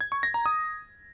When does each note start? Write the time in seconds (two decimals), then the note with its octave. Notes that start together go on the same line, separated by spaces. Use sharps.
0.01 G#6
0.12 C#6
0.23 A#6
0.34 A#5
0.46 D#6